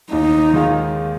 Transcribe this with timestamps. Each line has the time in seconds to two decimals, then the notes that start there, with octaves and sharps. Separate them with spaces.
0.12 D#2 D#4
0.53 D#3 G#3 F4